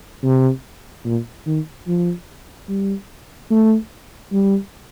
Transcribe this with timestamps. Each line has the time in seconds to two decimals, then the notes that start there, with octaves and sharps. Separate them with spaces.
0.24 C3
1.05 A#2
1.47 D#3
1.88 F3
2.69 G3
3.51 A3
4.32 G3